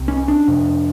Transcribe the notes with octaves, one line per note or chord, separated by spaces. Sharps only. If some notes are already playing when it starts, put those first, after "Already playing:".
Already playing: C2 C3
C#4
D4
F2 C3